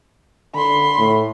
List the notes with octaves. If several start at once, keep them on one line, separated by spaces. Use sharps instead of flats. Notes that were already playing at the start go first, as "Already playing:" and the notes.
D3 B5 C6
A2